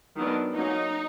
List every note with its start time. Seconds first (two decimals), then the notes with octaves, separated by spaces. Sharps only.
0.16 D#3 F#3 B3 D4
0.55 F#3 A#3 C#4 D#4